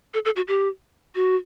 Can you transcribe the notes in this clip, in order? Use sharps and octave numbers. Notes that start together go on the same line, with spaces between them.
A4
A4
F#4
G4
F#4